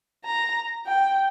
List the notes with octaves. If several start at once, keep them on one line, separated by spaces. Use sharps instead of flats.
A#5
G5